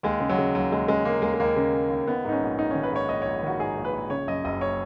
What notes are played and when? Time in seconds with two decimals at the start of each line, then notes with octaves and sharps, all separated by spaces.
0.03 D#2 G#3
0.20 C#3
0.29 F#3
0.38 C#3
0.55 D#2 F#3
0.72 D#2 G#3
0.88 C#3 G#3
1.05 C#3 A#3
1.22 D#2 G#3
1.34 G#3
1.40 D#2 A#3
1.56 C#3
1.73 C#3
1.90 D#2
2.07 D#3 B3
2.25 G#2 D#4
2.32 C#4
2.41 A#1
2.58 A#1 D#4
2.71 D#3 C#4
2.83 B4
2.92 G#2 C#5
3.09 A#1 D#5
3.22 A#1 C#5
3.43 D#3 F#4
3.60 G#2 G#4
3.77 A#1
3.85 B4
3.93 A#1
4.10 C#3 C#5
4.27 F#2 D#5
4.44 F#1 D#5
4.61 C#5